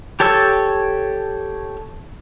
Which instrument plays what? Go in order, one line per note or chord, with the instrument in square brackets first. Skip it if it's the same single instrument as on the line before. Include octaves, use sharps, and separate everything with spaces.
[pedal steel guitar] G4 A4 C#5 A5 E6